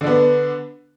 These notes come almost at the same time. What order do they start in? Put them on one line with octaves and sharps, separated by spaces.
D3 D4 B3